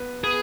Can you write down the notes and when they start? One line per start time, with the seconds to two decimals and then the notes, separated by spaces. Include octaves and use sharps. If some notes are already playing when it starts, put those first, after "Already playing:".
Already playing: B3 B4
0.24 B3 G#4 B4